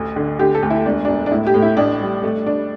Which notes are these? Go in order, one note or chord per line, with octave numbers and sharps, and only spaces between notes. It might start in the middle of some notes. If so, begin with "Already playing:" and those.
Already playing: A1 D2
D3
D3 G4
A4
D2
E4
E1 D4
E1 D4
D4
A2 E4
G4
A2
E4
A1 D4
G3
A3
D4